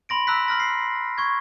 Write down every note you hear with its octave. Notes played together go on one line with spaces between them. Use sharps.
B5 C6 A#6 D7
A#5 E6 F#6 B6
C6 F6 A#6
C7
C#6 G#6